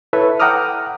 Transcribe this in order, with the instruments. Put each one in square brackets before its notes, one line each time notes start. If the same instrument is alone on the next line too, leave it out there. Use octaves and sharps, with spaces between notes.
[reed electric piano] E4 A4 B4 C#5 E5
F#5 G5 A#5 D6 D#6 F6